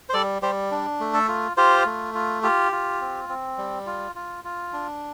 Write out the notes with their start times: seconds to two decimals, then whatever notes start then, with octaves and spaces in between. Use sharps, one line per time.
0.09 C5
0.14 G3 A4 D5
0.42 G3 G4 C5
0.71 D4
1.00 A3
1.14 A4
1.28 F4
1.57 F4 G4 C5
1.86 A3
2.15 F4
2.43 F4 G4
2.72 F4
3.01 C4
3.29 C4
3.58 G3
3.87 F4
4.15 F4
4.44 F4
4.73 D4